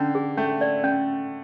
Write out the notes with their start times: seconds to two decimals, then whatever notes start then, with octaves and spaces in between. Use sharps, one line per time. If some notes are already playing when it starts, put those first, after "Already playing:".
Already playing: D3 C#4
0.15 G#4
0.37 A3 C#4
0.61 D5
0.84 C#4